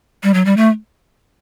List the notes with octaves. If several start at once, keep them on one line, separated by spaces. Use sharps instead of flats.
G3
F#3
G3
A3